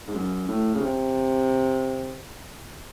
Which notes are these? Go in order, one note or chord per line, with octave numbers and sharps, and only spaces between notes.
G#2
F#2
A2
C#3
C3